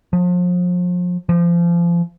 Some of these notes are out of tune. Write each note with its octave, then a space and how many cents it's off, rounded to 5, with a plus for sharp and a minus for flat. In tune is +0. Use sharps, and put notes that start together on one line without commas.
F3 +35
F3 -30